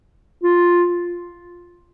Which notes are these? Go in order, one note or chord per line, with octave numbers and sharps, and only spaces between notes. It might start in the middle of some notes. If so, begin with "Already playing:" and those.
F4